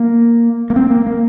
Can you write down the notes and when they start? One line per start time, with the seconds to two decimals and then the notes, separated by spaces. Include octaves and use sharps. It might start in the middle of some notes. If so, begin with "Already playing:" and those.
Already playing: A#3
0.70 A#3
0.76 C4
0.90 A#3
1.07 A#3